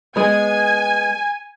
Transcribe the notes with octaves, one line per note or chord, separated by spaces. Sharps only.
G#3 B3 G#5